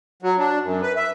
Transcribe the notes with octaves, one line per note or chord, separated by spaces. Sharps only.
F#3
D4
F#2
B4
E5